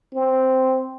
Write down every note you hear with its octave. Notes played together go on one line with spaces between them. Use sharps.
C4